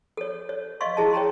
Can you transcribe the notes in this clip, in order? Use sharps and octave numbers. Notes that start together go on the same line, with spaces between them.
A4 C#5
C#5
D#5 F5 C6 C#6
E4 G#4 D#5 A5
C#5 G5 A#5 C6